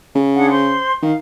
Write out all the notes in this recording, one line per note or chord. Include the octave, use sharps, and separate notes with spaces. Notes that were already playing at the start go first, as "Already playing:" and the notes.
C#3
D4 G#4 F#5
C5 C6
D#3 F5